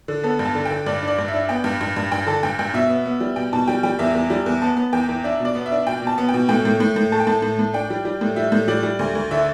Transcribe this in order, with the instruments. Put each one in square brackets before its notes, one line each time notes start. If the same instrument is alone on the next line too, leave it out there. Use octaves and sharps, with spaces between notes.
[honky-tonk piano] D3
B3 A4
G2
A5
D3
G5
D3
G2 D5
D4
D5
G2
E5
D4
B3 G5
G2
G2
G2
G2 G5
D3 A5
G2 G5
G2 G5
B2 E5
B3
B3
G3
B2 G5
B2 A5
G3 G5
G3 G5
E2 E5
E2
G3
E2
B3 A5
B3
E2 G5
E2
D4 E5
B2 D5
B3
E5
D4
B2 G5
B2 A5
B3
G5
B2
A2 G5
A2
A2
A2
A3 A5
G5
A2 A5
A2
A2
D4 G5
G3
G3
A2
G3 E5
A2
G3 D5
G3
D2
D2
D3 E5